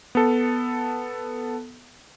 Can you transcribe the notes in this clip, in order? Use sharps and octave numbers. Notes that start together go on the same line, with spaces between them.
B3 A4